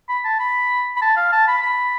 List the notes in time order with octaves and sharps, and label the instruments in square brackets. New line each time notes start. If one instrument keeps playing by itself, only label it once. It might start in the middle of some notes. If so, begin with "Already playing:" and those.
[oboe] B5
A5
B5
B5
A5
F5
A5
B5
B5